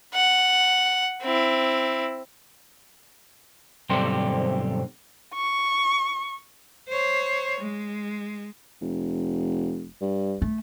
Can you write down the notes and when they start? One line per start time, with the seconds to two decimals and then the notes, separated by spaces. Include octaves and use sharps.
0.14 F#5
1.22 C4 E4
3.90 B1 G2 D3 C4 G4 C5
5.34 C#6
6.89 C5 C#5
7.61 G#3
8.81 F1
10.01 G2
10.42 A3